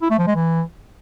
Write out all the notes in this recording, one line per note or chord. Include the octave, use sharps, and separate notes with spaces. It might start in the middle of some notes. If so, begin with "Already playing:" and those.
E4
A3
F3
G#3
E3